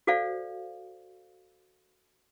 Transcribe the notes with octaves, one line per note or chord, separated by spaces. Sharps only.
F#4 A4 C5 D5 F5